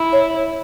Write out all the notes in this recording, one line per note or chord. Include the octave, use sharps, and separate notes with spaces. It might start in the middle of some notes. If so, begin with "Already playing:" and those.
Already playing: E4
C#5